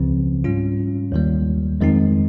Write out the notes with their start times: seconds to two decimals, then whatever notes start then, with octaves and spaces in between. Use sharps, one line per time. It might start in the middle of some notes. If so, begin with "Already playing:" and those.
Already playing: C#2 C#3 F3 C4
0.44 G#2 G3 C#4 F4
1.12 D#2 D#3 G3 A#3
1.81 F2 D#3 G#3 C4 D#4